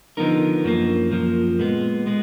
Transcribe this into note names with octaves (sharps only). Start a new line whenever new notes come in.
D3 F3 B3 D#4 A#4
F#2 F3 A#3
F#2 F3 A#3
A#2 G#3 B3
G#3 B3